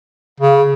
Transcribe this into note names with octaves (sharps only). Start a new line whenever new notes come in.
C#3